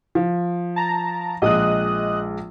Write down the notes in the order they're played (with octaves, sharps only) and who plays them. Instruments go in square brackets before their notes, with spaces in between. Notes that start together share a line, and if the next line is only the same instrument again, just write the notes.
[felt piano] F3
[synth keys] A5 A#5
[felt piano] A#1 G#3 [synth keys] D#5 D#6 F#6